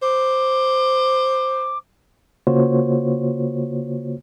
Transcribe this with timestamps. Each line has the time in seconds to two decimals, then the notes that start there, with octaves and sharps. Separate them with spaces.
0.02 C5 D6
2.47 C#3 A#3 F4 F#4 C5 C#5